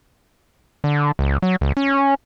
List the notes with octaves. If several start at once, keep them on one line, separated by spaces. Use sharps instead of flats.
D3
C#2
F#3
C#2
C#4